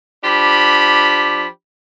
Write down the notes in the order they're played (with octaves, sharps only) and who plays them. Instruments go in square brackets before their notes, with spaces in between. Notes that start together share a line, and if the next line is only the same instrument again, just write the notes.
[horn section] F3 D4 G4 B5